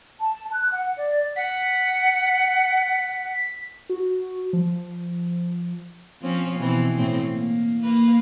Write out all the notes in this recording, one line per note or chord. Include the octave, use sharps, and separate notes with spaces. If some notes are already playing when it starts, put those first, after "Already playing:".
A5
F#6
F#5
D5
F#5 B6
F#4
F3
F3 C4 C#4
B2 E3 C4
A2 C4
A#3
A#3 B4